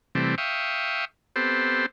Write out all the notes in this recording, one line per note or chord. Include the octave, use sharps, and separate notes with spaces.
C3 E3 G3 A3 C4
E5 F5 G5 C#6 D#6
B3 C4 G4 A4 C5